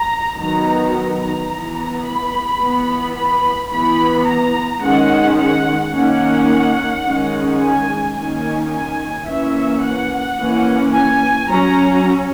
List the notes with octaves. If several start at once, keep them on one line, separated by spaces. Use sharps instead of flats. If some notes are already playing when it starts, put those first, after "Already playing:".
Already playing: A#5
D#3 F#3 B3 A#5
A#5
E3 B3
B5
E3 B3
B5
E3 B3 B5
A#5
D#3 G#3 C#4 F#5
F#5
D#3 A#3 C#4 F#5
D#3 G#3 C#4
G#5
D#3 A#3 C#4 G#5
G#5
E3 A#3 C#4 E5
F#5
E3 A#3 C#4
G#5
F#3 C#4 A#5